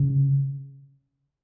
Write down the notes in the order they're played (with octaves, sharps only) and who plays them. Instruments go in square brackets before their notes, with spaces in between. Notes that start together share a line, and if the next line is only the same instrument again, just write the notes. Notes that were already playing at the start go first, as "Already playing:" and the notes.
Already playing: [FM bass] C#3